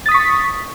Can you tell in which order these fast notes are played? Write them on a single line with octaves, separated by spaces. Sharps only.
A6 D#6 B6 C#6